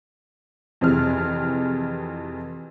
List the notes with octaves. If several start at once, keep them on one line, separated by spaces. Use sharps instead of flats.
F2 C3 E3 G#4 F6